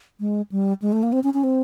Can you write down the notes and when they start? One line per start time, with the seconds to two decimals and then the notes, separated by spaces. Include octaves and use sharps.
0.20 G#3
0.52 G3
0.82 G#3
0.93 A3
1.03 A#3
1.13 C4
1.24 C#4
1.34 C#4
1.44 C4